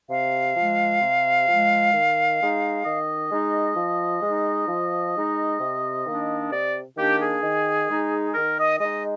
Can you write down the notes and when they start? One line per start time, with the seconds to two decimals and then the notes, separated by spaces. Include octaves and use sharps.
0.09 C3 F5
0.55 F3 G#3
1.01 C3
1.47 F3 G#3
1.94 D#3
2.39 G#3 D#4
2.84 D#3 D#5
3.31 G#3 D#4
3.76 F3
4.22 G#3 D#4
4.68 F3
5.14 G#3 D#4
5.59 C3
6.05 D#3 A#3 D4
6.51 C3 D5
6.96 D#3 A#3 D4 G4
7.20 G#4
7.42 D#3
7.89 G#3 D#4
8.34 D#3 A#4
8.58 D#5
8.80 G#3 D#4 D#5